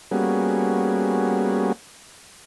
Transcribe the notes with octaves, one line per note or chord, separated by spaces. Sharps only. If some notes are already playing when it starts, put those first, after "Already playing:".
G3 A#3 B3 C#4 F#4 G#4